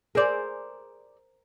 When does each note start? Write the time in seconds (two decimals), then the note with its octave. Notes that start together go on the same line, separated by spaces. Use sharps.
0.15 G#4 A#4 C5 D5